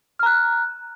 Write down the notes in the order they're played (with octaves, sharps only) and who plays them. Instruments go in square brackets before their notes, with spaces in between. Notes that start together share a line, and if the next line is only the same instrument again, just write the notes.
[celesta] F6
A#5
F#6